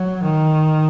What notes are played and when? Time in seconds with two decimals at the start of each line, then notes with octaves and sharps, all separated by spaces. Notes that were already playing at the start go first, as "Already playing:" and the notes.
Already playing: F#3
0.23 D#3